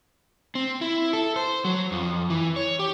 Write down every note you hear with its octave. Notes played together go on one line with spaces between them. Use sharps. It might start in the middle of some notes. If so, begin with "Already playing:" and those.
C4
E4
A4
C5
F#3
F2
E3
C#5
G4